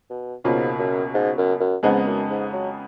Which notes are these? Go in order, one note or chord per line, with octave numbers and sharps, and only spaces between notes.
B2
C#2 G#2 B2 A#3 C#4 F4
F#2
G#2
F#2
F#2
F2 G#2 C#3 G#3 B3 D#4
F#2
G#2
F#3